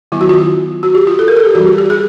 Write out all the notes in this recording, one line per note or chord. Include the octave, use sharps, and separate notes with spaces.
D#3 F#3 B3 E4
F#4
F4
F#4
G4
F4
A4
A#4
A4
G4
E3 G3 C4 F#4
G4
G4
G#4